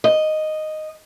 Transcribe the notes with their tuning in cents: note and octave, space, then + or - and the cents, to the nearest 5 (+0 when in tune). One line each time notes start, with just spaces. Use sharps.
D#5 -5